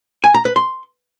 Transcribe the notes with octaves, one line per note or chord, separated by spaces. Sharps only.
G#5
A#5
B4
C6